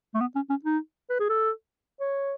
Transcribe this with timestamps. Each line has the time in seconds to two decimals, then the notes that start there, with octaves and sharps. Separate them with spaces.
0.14 A3
0.21 B3
0.35 C#4
0.50 C#4
0.64 D#4
1.10 B4
1.20 G#4
1.29 A4
2.00 C#5